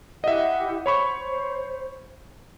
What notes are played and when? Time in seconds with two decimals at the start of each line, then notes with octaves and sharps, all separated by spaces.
0.24 E4 G4 D#5 E5 F#5
0.86 C5 C#5 B5 C#6